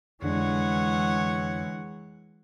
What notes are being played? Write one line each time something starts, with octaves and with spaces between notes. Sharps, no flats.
F2 D3 E3 G#3 D4 C#5 F#5